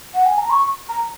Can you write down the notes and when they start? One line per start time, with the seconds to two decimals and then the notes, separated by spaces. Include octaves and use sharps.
0.14 F#5
0.26 G#5
0.38 A#5
0.50 C#6
0.89 A#5